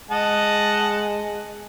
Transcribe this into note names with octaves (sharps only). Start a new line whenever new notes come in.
G#3 D#5 F#5 A5